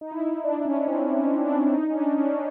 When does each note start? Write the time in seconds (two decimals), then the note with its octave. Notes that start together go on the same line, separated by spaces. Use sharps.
0.01 D#4
0.11 E4
0.22 D#4
0.44 D4
0.65 C#4
0.79 C#4
0.88 C4
1.15 C#4
1.45 D4
1.74 D#4
1.90 C#4
1.95 D4
2.18 C#4